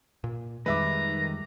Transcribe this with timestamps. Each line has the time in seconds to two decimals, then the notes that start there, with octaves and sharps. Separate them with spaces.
0.24 A#2
0.66 F2 D#3 G3 G#3 B4 E5 A#5 D6